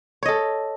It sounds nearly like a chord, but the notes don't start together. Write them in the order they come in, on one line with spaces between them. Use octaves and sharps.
C#5 D#5 A4